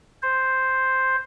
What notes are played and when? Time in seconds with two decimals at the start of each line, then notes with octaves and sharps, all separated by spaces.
0.22 C5